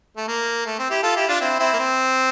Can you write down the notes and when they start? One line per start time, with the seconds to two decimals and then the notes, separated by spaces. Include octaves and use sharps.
0.17 A3
0.28 A#3
0.66 A3
0.79 C4
0.90 E4 G4
1.03 F4 A4
1.16 E4 G4
1.28 D4 F4
1.41 C4 E4
1.59 C4 E4
1.73 A#3
1.79 C4